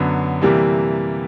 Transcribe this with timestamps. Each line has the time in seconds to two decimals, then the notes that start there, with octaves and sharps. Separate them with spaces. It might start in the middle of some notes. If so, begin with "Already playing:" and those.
Already playing: F#2 D3 F#3 B3
0.42 C3 E3 G3 A#3